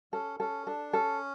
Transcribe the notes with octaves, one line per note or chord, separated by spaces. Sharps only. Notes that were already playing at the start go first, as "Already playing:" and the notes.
C#4 A4
C#4 A4
D4 A4
C#4 A4